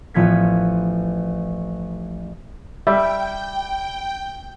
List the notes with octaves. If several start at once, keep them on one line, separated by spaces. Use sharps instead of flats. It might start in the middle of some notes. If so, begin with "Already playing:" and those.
A1 F3 B3 G#6 B6
G3 E5 G5